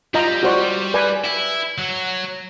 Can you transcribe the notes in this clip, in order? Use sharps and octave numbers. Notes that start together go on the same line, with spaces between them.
G3 F4 D#5 A#5
F#4 C5 D5
B4 D5 G#5
E4
F#3